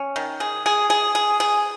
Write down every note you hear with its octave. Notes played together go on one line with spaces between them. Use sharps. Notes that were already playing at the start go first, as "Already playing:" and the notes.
Already playing: C#4
D#3
G#4
G#4
G#4
G#4
G#4